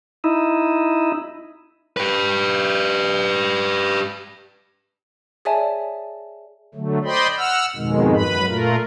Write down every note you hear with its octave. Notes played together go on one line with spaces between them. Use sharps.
D#4 E4
G4 B4
G#4 C#5 D5 E5 G#5 A5
D3 F#3 A3
C5 D5 D#5 G5 B5 C6
F#5 E6 F6
F2 G#2 B2 D#3 G#3
F#2 B4 B5
A#2 A3 F4 A#4